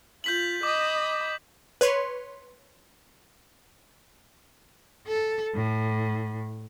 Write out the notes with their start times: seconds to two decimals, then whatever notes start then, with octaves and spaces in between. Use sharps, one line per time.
0.24 F4 G6 B6 F#7
0.63 D#5 B5 D6
1.81 B4 C#5 C6
5.07 A4
5.55 A2